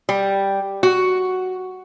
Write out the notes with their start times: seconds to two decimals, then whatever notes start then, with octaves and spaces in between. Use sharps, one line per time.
0.09 G3
0.83 F#4